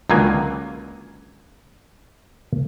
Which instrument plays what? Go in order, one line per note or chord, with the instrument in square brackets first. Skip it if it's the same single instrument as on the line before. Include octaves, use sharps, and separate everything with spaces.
[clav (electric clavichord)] C#2 D3 D#3 F#3 A#3 G#5